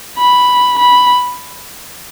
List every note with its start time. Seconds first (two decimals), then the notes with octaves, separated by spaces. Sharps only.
0.18 B5
0.78 B5